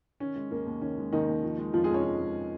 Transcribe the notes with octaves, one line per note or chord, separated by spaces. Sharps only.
D#3 C#4
G#3
D#2 A#3
D#2
D#3 C#4
G#3
D#2 D#3 D#4
D#2
F3
G#3
F2 F3 F4
F2 G#3 G#4
C#4 C#5
F3
G#3